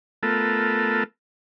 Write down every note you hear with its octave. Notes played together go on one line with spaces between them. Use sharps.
A3 B3 F4 A4 A#4